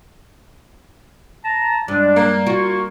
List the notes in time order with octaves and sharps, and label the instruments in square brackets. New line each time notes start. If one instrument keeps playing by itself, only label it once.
[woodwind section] A5 A#5
[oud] G2 [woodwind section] G#3 D4
[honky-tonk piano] A#3
[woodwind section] F4 C#6 [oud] F#4